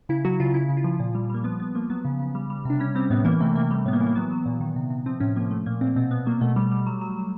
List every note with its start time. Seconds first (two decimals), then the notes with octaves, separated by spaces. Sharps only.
0.09 C#3 E4
0.25 F#3 F#4
0.40 C#3 F4
0.54 C#3 E4
0.69 C#3
0.77 F4
0.84 F3
1.00 A#2
1.15 G3
1.30 G3 A#3
1.44 F3 B3
1.60 F3 B3
1.75 F3 A#3
1.90 F#3 B3
2.05 C#3
2.19 C#3
2.35 G3
2.50 G3
2.65 C3 D4
2.80 G3 C#4
2.95 G3 C4
3.10 A2 B3
3.25 E3 A#3
3.40 C3 A3
3.55 C3 A#3
3.70 G3 A3
3.86 A2 B3
3.93 A#3
4.00 E3
4.07 A#3
4.15 F#3 B3
4.31 F#3
4.46 A#2
4.61 D#3
4.76 C3
4.90 C3
5.06 F3 C4
5.20 A2 C#4
5.36 F3 A#3
5.51 F3 A3
5.66 A#2 A#3
5.81 A#2 C4
5.96 B2 C4
6.11 B2 B3
6.26 F#3 A#3
6.41 B2 A3
6.56 G3
6.72 G3
6.87 F#3
7.01 F#3
7.16 F#3